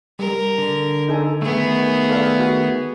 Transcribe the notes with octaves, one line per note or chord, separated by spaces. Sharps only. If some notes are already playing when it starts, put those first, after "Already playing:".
G3 A#4
D3
D#4 A4 G#5
D#3 A3 B3 G#4
A4 D5 F5
F#4